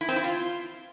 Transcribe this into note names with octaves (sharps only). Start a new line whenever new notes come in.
E4
C4
E4
F4